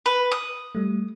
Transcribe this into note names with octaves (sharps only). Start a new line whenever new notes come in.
B4
D#6
G3 A3